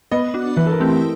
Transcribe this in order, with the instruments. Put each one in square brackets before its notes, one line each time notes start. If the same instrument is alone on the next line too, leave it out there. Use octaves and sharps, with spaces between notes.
[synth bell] B3 [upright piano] D#5
[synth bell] D4 F#4
[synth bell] E3 [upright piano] B4
[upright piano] A4
A#4
[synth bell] A3 C4 E4 G4